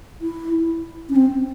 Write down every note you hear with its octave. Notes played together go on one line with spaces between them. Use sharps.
E4
C#4
C4